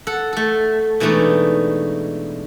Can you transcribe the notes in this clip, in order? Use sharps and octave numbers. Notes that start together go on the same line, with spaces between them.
A4 F#5
A3 A4
B2 E3 G#3 A3 D4 D#4